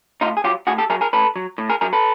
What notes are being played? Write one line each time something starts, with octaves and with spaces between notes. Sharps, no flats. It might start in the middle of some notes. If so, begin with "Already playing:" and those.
A2 D#4 F4
G#4
F#3 F4 G4
A2 F#4 G#4
G4 A4
F#3 G#4 A#4
G#4 A#4
A2 A4 B4
F#3
A2
G#4 A#4
F#3 G#4 A#4
A4 B4